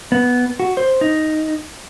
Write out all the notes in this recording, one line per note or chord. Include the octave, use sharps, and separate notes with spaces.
B3
F#4
C5
D#4